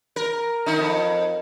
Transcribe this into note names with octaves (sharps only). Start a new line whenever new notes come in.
A#4
D#3 D#4
F2